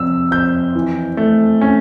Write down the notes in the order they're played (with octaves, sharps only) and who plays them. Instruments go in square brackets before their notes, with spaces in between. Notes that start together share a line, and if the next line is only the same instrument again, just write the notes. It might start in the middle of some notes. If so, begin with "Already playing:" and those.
Already playing: [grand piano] F2 C3 F3 E6
F2 G6
E3
A3
C#4